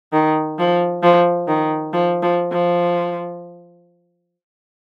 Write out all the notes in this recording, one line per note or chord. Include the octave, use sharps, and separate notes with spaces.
D#3
F3
F3
D#3
F3
F3
F3